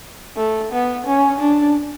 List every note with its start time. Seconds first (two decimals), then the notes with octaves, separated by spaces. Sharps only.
0.37 A3
0.72 B3
1.06 C#4
1.41 D4